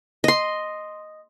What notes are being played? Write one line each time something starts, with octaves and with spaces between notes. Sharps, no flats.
D#5 C6